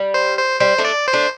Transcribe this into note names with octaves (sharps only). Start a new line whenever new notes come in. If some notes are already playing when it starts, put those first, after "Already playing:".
Already playing: G3
C5
C5
G3 C5
A3 D4
D5
C5
A3 D4